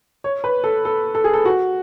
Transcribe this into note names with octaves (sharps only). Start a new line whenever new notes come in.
C#5
B4
A4
A4
A4
G#4
A4
F#4